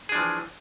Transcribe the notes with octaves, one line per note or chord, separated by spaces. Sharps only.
E3 F3 D4 G#4